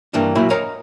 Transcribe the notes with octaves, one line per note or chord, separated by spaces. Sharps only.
G2 E3 A#3 D4
A#2 F#3 A#3 E4 B5
A#4 C#5 D#5 F5 A#5